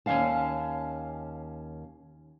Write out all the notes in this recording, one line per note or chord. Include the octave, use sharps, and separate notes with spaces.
D#2 A#3 C#4 F5 A5